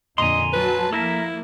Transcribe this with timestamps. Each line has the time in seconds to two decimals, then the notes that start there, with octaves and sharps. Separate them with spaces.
0.18 F2 A#2 D3 D#5 G#5 A#5 C6
0.53 F#3 B4 A5
0.93 F3 A#3 E4 A4 A#4 E5